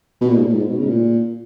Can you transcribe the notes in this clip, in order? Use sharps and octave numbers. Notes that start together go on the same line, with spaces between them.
B2
A#2
G#2
A#2
G#2
B2
C#3
G#2
A#2